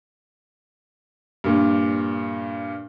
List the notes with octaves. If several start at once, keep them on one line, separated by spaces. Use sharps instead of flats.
G2 A#2